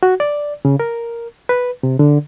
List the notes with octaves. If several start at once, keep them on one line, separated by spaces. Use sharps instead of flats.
F#4
D5
C#3
A#4
B4
C3
D3